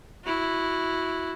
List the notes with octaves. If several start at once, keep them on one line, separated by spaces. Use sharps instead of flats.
E4 F#4